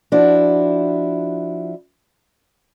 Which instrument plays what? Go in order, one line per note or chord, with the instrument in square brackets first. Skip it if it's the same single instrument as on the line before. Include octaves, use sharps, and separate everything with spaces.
[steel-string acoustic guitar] F3 D4 E4 F#4